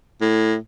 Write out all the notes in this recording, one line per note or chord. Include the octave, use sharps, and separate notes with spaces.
A2